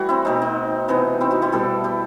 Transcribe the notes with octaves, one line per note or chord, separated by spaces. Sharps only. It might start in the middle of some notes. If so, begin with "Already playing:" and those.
Already playing: E3 G3 A3 F#4
C4 E4
B2 A3 C4 D#4
D#4
C3 E3 B3
C4 E4
D#4 F#4
E4 G4
B2 G3 B3 F#4 A4
E4 G4